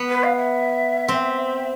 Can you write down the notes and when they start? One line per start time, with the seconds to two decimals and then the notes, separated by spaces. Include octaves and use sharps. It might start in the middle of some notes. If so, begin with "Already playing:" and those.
Already playing: B3
0.09 B4
0.23 F5
0.36 E5
1.08 C4